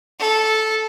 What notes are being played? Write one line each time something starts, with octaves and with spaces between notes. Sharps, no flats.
A4